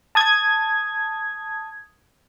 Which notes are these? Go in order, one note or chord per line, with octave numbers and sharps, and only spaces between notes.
A5 D#6 G#6